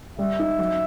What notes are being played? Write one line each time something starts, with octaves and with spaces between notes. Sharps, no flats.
G3 E5
D#4
F#3